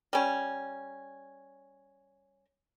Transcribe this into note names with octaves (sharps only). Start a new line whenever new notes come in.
G3 C#4